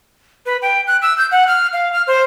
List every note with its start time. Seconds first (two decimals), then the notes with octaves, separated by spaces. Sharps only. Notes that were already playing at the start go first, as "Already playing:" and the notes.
0.46 B4
0.62 G5
0.87 F#6
1.02 E6
1.18 G6
1.31 F#5
1.48 F6
1.73 F5
1.93 F6
2.07 C5